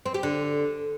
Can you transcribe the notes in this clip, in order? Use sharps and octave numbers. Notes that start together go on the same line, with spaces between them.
C4
G4
D3